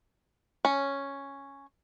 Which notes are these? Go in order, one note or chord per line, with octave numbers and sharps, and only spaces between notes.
C#4